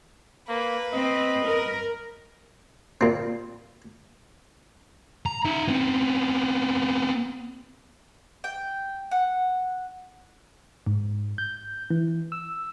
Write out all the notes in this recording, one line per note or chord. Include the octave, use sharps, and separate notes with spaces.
A#3 B4
C4 D#5
A#4
A#2 C4
A#5
D#4 E5
B3 C4
G5
F#5
G#2
G6
E3
E6